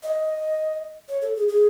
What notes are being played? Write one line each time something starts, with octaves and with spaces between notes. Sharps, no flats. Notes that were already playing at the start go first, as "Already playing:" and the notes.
D#5
C#5
A4
G#4
G#4